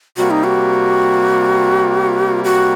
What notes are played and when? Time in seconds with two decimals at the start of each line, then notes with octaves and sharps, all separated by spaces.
0.17 C3 G3 A#3 F#4
0.30 D#4
0.44 F#4
2.44 F#4